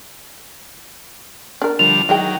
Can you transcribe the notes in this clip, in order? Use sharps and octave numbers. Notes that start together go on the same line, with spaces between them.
D4 A#4
D3 F3 G3 F7
D#3 E3 F#3 G#3 G5